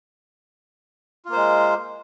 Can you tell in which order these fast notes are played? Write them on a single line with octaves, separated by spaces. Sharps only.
F4 A#3 C5 G#3